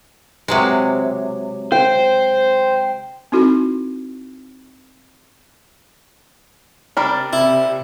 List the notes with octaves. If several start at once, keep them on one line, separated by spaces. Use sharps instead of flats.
C3 F#3 G#3
C5 G5
C4 D#4 E4 F#4 A4
C3 G3 D4 A#4
E4